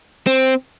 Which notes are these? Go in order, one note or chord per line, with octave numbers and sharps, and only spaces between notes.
C4